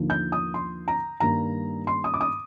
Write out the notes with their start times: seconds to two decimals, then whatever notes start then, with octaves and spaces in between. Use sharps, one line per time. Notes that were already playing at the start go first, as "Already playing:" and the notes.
Already playing: D#2 D3 F3 A#3
0.10 G6
0.32 D#6
0.54 C6
0.88 A#5
1.20 G2 D#3 G3 A#3 A#5
1.87 C6
2.04 D#6
2.14 D6
2.21 D#6